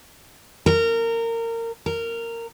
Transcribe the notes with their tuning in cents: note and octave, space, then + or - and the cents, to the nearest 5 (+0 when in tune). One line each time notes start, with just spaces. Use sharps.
A#4 -25
A#4 -15